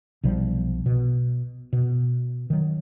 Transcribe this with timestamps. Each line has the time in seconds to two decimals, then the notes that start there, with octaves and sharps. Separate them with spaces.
0.23 B1 C3 F3 G3
0.86 B2
1.73 B2
2.50 D#3 F#3